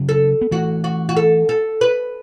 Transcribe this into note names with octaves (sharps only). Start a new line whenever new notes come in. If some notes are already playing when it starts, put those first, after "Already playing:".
Already playing: C#3 F#3
A4
B3
E3 A3 F#4
F#4
F#4
A4
A4
B4